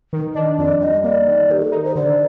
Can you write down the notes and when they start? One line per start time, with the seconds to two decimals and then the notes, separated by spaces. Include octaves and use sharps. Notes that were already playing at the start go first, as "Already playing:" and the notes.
0.13 D#3
0.35 D4 D#5
0.58 F2 D5
0.81 G3 D#5
1.04 A#3 D5
1.27 D#3
1.50 D#3 G4
1.62 A4
1.72 D#4 A#4
1.84 C5
1.95 D3 D5